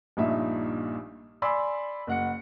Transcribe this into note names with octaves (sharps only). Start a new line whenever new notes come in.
A#1 G2 A#2 D#4 E5
D5 G#5 B5 C6 E6
F#1 F#5 C#7